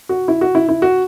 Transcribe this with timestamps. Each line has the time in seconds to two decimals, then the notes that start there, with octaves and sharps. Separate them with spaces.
0.09 F#4
0.28 E4
0.41 F#4
0.55 E4
0.69 E4
0.82 F#4